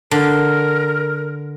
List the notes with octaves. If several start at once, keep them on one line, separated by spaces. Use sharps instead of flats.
D3 A#4